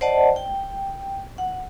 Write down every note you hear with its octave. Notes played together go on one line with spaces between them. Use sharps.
C5 D5 D#5 F#5 A5
G5
F#5